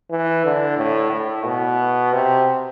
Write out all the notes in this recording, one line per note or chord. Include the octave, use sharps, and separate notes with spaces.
E3
D3
A2
A2
B2
C3